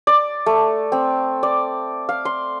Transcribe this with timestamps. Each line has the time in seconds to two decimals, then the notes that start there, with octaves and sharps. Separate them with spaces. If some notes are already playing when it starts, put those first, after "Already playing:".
0.07 D5
0.46 A3
0.92 C4
1.43 D5
2.09 F5
2.25 C6